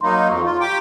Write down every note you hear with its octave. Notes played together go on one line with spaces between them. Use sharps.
F#3 A#3 D#4 B5 C6
F2 F3 C#6
F4
G4 G5 A#5 D6